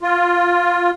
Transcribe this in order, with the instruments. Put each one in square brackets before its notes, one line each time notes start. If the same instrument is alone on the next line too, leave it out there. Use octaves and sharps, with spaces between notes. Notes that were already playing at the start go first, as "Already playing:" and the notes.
[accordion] F4